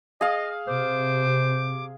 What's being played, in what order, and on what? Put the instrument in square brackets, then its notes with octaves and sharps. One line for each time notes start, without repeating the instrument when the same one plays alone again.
[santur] G#4 F5 [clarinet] D#5
[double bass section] C3 [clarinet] C5 [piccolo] D6